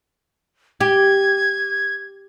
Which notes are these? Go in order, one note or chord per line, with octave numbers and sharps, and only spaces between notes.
G4 G#6